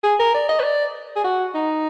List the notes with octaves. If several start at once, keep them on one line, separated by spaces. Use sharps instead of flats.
G#4
A#4
D5
D#5
B4
D5
G#4
F#4
D#4